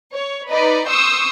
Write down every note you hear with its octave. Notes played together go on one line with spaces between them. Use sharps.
C#5
D#4 B4 D5 D#5 B5
C6 C#6 D#6 E6 G6